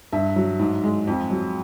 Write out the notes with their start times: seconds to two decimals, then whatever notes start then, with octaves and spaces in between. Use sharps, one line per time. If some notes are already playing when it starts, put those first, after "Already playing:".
0.13 G2 E5
0.36 F#3
0.59 G#2
0.84 G#3
1.07 F2
1.31 F#3